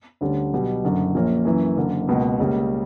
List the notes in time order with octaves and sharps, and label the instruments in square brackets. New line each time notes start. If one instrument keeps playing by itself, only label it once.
[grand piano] D2 D3 G3 C#4
B1 B2 G3
F#1 F#2 D3
A#1 A#2 A#3 C#4
F#2 E3 A#3
F#1 F#2 D3 A#3
C#2 B2 A#3
C#2 C#3 G3 A#3